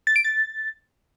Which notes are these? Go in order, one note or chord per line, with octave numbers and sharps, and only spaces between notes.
A6
D7
A6